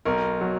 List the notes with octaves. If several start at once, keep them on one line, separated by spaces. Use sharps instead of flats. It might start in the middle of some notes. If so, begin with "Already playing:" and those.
B1 A#4
F#3